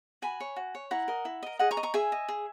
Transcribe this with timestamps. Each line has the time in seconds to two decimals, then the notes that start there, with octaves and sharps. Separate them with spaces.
0.22 F#4 G#5 B5
0.40 C#5
0.56 F#4
0.75 C#5
0.91 E4 F#5 A#5
1.08 A#4 D#5
1.25 E4
1.43 A#4 D#5
1.59 G#4 D#5 F#5
1.71 A#5 C#6
1.77 D#5
1.83 A#5 C#6
1.94 G#4 E5 G#5
2.12 D#5
2.29 G#4